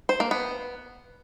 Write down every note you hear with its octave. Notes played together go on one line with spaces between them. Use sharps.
C5
A#3
B3